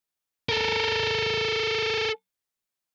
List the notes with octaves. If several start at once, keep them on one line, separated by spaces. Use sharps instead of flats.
A4 A#4